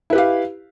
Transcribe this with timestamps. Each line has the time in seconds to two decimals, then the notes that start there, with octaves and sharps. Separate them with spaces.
0.10 E4
0.13 B4
0.15 G4
0.18 F5